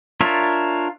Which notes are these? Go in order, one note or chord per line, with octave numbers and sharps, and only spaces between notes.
D4 F4 A#4 C#5 E5